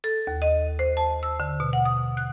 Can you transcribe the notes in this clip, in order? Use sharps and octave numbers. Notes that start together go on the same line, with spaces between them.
A4
D#2
D#5
C5
A5
E6
D3
B2
F#5
D#6
F#6